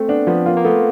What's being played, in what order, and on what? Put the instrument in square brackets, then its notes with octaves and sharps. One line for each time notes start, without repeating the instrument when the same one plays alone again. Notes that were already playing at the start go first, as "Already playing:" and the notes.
Already playing: [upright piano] A3 [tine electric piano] C4
[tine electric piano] B3 [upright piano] D4
[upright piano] F3 [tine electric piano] B3
[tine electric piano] A#3 [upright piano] F4
[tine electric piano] A#3
[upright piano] A3 [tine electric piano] B3